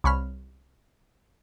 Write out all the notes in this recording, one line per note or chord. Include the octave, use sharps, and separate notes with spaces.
C2 C#5 B5 F6